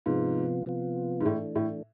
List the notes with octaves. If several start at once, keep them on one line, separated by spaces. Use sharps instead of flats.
G#2 C3 F3 B3 F4
C3 F3 B3 F4
G#2
A2 E3 A3 D4
A2